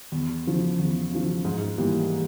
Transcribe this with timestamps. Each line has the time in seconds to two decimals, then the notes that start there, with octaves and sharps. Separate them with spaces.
0.12 E2
0.46 C#3 F3
0.79 E2
1.11 C#3 F3
1.45 G#2
1.78 E3 G3 A#3